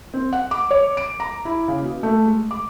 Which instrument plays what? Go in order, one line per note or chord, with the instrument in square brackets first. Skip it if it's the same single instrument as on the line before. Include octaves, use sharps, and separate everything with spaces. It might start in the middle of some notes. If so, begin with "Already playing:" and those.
[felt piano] C4
F#5
D6
C#5
D7
A#5
E4
C#3
B2
A3
G#3
D6